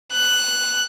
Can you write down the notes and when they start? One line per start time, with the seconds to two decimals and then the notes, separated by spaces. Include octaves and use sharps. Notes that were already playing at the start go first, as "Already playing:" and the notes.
0.12 F#6